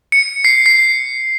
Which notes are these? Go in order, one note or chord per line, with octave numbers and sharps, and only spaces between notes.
C#7
C7
C7